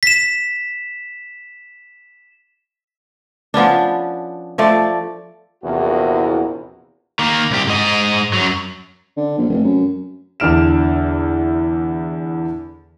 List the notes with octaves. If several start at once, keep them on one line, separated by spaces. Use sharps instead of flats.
B6 E7
F3 B3 C#4 D4
F3 A3 D5
A#1 E2 C3 E4 F#4 A#4
D#3 A#3
C2 G4
G#2 D#5
F#2 F#3
D3
A#1
F1
F#2
E2 D3 D4 F6 D7 E7